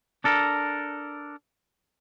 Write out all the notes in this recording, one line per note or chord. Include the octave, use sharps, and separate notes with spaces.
D4 A4 A#4